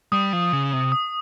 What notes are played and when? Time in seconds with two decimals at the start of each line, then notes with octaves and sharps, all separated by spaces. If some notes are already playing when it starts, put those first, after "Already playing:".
0.12 G3 D#6
0.33 F3
0.52 C#3
0.73 C3
0.92 D#6